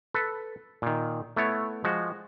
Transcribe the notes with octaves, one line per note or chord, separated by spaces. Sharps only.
A4 B4
A#2 D#3
A3 B3 E4 C#5
F3 G#3 F#4